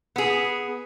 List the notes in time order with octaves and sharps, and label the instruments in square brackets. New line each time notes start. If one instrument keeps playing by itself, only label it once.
[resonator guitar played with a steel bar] B3 G#4